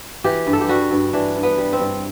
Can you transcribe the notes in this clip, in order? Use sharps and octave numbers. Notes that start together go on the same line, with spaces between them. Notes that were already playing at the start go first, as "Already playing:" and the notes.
E3 G4
G2
A4
G4
G3 F#4
G2
E3 D4
G2
B3
G3
C4
G2